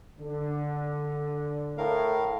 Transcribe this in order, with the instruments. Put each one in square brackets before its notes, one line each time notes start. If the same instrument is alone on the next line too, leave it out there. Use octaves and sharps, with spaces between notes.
[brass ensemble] D3
[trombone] A2 [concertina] A#4 F5